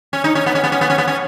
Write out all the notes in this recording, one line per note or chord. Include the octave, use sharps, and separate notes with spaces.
C#4
D#4
C#4
B3
C#4
B3
C#4
B3
C#4
B3
C#4